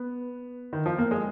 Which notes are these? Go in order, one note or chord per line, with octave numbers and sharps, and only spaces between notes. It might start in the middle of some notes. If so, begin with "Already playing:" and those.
Already playing: B3
D#3
F3
A#3
G#3